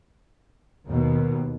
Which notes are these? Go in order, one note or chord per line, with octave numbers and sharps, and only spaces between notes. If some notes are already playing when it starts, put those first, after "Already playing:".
D#2 B2